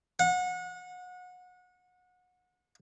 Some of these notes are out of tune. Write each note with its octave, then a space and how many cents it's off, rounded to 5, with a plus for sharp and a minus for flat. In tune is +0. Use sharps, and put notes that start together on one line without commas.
F#5 -30